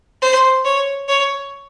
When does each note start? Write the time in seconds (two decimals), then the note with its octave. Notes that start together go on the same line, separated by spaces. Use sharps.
0.22 C5
0.65 C#5
1.08 C#5